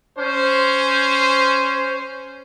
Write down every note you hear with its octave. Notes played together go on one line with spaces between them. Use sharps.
C#4 C5